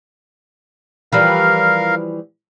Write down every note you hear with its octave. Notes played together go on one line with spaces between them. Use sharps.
E3 F3 G3 A#4 F5